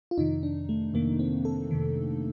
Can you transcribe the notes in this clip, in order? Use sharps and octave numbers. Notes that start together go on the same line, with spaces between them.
F4
F2 C3 D#3 D#4
D4
A3
F2 C3 D#3 A#3
C4
A4
F2 C3 D#3